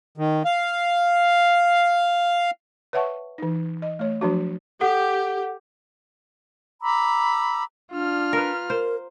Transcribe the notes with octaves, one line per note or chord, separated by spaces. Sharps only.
D#3
F5
B4 C#5 E5 F#5 A5 C#6
E3 D#4
D#5
A3 C#5
F3 F#3 D4 F#4
G4 A4 F#5
A#5 B5 D6 E6
D4 F4 F6
A#4 B4
A#4 C5